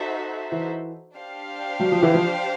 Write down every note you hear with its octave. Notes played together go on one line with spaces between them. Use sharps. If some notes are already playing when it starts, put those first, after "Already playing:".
Already playing: D#4 F#4 A4 C5 E5
E3
D4 G4 C5 F5
F#3
F3
E3
F3